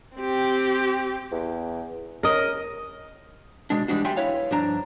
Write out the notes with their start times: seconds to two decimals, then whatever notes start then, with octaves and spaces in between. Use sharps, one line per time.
0.16 C4 G4
1.31 E2
2.23 C#4 A#4 D#5
3.70 B2 G#3 D4
3.88 E3 G3 G#3 D4 F#4
4.04 B1 G3 E5 G5 G#5 C6
4.17 E4 B4 C#5 F5
4.51 G2 F3 D4 A#5